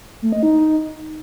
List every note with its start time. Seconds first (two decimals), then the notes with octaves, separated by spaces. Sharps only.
0.22 A3
0.32 D#5
0.43 D#4